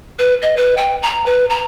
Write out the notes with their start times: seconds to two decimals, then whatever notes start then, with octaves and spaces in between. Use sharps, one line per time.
0.18 B4
0.42 D#5
0.56 B4
0.77 G5
1.02 A#5
1.25 B4
1.49 A#5